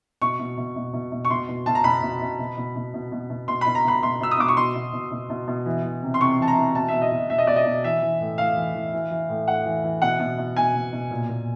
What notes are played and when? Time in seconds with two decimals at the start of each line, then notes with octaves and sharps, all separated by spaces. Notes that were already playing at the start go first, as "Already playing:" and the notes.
0.22 B2 C#6
0.39 B2
0.57 B2
0.76 B2
0.93 B2
1.12 B2
1.25 C#6
1.30 B2 C6
1.49 B2
1.66 B2 A5
1.75 A#5
1.84 B2 B5
2.02 B2
2.22 B2
2.39 B2
2.58 B2
2.76 B2
2.94 B2
3.12 B2
3.30 B2
3.48 B2 C6
3.61 B5
3.66 B2
3.75 A#5
3.85 B2 B5
4.03 B2 C6
4.21 B2 E6
4.31 D#6
4.39 B2 D6
4.48 C#6
4.57 B2 C6
4.75 B2
4.93 B2
5.11 B2
5.30 B2
5.48 B2
5.66 E3
5.84 E3
6.03 C3
6.14 C6
6.20 C3 C#6
6.39 E3 A5
6.48 A#5
6.57 E3
6.75 B2 A5
6.88 E5
6.93 B2
7.02 D#5
7.12 B2
7.29 B2 E5
7.38 D#5
7.47 B2 D5
7.56 D#5
7.66 B2
7.84 E3 E5
8.02 E3
8.20 A2
8.38 A2 F5
8.56 E3
8.75 E3
8.93 E3
9.11 E3
9.29 A2
9.47 A2 F#5
9.66 E3
9.84 E3
10.02 B2 F#5
10.20 B2
10.38 B2
10.57 B2 G#5
10.74 B2
10.93 B2
11.11 A#2
11.29 A#2